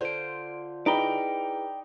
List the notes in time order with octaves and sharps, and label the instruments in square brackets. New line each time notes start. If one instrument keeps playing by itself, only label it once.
[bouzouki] D3 F4 C5 [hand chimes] D5 D7
[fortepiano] D#4 A#5 B5 [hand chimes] E4 G#4 B4 [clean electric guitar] D5 G5